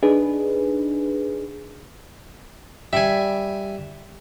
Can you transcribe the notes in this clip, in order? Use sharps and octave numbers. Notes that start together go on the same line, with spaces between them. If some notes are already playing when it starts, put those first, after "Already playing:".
D4 D#4 G#4 B4
G3 E5 G#5